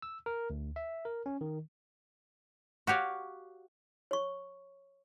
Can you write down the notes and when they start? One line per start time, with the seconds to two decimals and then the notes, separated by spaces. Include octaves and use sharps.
0.02 E6
0.26 A#4
0.50 D2
0.76 E5
1.05 A#4
1.26 C#4
1.41 D#3
2.87 F#4 G4 C#5 F5
4.11 C#5 C#6